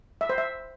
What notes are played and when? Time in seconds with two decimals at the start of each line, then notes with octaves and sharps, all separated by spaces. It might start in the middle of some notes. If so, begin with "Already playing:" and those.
0.21 E5
0.29 C5
0.38 E5